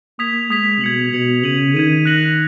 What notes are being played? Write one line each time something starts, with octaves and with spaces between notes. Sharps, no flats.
A#3 D#6 G#6 B6 F7
G#3 D#6 G#6 B6 F7
B2 G#6 C#7 F#7
B2 G#6 C#7 F#7
C#3 G#6 D#7 F#7
D#3 G#6 D#7 F#7
F#6 A#6 C#7 F#7